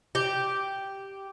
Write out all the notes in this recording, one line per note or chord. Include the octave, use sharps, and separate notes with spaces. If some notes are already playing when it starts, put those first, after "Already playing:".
G4